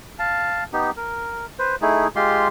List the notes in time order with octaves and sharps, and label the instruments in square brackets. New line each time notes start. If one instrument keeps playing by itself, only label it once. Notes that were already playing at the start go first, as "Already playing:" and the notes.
[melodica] F5 A5
B3 D#4 G4
A#4
B4 C5
A3 D#4 E4 G#4
G#3 F4 G4 C6